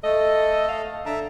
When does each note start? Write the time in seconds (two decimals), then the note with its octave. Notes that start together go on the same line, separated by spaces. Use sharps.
0.04 A3 A4 D#5
0.69 F5
1.06 D3 E5 A5 A#5